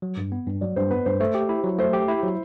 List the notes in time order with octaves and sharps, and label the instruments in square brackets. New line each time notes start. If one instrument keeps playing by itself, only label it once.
[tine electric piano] F#3
G2
B3
G2
[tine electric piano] F#3 [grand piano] D5
[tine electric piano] G2 [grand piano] C5
[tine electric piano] B3 [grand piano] B4
[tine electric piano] G2 [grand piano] C5
[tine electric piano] A3 [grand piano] C5
[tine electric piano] G4
E4
F#3
[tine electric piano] A3 [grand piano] C5
[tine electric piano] G4
E4
F#3